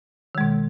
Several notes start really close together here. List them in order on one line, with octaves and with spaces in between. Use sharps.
D#3 G#3 B2